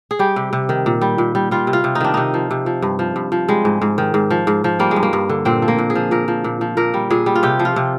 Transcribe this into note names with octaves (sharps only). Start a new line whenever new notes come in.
G#4
G3 G4
C3
C3
D#3
A#2
G3
A#2
G3
G3 F4
C3
F4
C3
D#4
D#3 D4
C3 D#4
F3
C3
F3
G2
F3
G2
F3
G3 G#3
G#2
G#2
D#3
G#2
F3
G#2
F3
G3 A#3
G#3
G2
A#3
G2
D3
A#2 C4
F3
A#3
A#2
G#4
F3
A#2 A#4
F3
A#2
F3
A#2 A#4
G3
A#2 G#4
G3
F4
C3 G4
F3
F4
C3